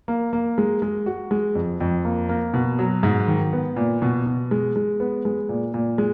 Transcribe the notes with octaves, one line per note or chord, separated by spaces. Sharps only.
A#3
A#3
G#3
G#3
F#4
G#3
F2
F2
A#3
A#3
B2
F#3
G#2
D#3
B3
A#2
B2
B2
G#3
G#3
B3
G#3
A#2
A#2
G#3